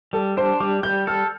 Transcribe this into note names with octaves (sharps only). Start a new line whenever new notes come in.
G3 A4
D4 C5
G3 D6
G3 G6
A4 F6